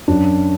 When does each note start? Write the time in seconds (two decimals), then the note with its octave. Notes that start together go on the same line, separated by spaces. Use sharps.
0.08 F#2 D4